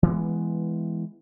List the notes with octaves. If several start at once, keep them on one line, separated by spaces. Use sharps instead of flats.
E3 G#3 A#3 B3